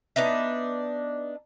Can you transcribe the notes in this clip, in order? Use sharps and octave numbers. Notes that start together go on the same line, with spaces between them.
B3 D4 D#4 E5